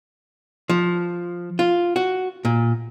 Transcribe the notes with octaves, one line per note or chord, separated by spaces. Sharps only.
F3
F4
F#4
A#2